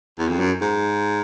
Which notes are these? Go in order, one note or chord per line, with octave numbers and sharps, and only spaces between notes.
E2
F2
F#2
G#2